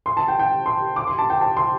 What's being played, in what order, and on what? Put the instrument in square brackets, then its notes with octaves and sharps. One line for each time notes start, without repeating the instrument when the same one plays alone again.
[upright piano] C6
A5
G5
G5
C6
D6
C6
A5
G5
A5
C6